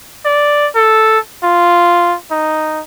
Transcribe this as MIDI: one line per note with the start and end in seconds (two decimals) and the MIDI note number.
0.25 0.68 74
0.75 1.19 69
1.43 2.15 65
2.31 2.81 63